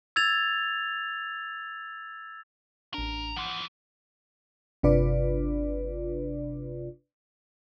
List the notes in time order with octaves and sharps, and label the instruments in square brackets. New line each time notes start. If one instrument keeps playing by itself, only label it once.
[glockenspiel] E6 G#6 A6 F7
[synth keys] A1 D4 [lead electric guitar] A#4
[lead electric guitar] E3 F3 [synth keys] F#5 C6 D#6
[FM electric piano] G1 C3 D4 F4 B4 D5